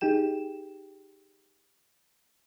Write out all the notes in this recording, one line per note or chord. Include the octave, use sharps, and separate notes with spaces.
D#4 G4 G#4 G5 E7